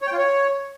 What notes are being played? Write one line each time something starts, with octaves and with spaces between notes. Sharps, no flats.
C#5
G5
F4
C#5